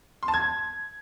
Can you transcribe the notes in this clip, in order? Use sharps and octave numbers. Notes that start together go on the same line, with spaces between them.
C6
A5
G#6